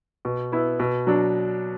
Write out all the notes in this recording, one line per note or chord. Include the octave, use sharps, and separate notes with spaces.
B2
B3 E4
B2
F#3 D4